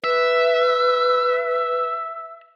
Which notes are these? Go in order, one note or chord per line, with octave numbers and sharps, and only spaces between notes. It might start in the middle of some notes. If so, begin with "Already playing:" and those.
B4 E5